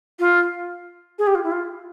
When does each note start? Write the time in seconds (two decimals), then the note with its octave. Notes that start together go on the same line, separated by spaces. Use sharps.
0.19 F4
1.18 G#4
1.27 G4
1.35 F4
1.43 E4
1.51 F4